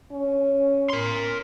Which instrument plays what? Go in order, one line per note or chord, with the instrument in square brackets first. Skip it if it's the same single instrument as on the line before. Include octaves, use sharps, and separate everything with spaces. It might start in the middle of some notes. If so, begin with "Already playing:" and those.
[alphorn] C#4
[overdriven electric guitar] A#4 C6